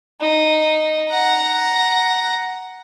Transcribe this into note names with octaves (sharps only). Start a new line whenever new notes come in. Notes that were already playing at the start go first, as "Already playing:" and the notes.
D#4
F#5 A#5